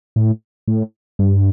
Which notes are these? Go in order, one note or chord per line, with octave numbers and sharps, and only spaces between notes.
A2
A2
G2